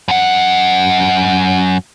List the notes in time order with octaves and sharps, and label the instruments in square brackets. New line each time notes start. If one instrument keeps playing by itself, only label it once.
[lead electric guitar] F#2 F#5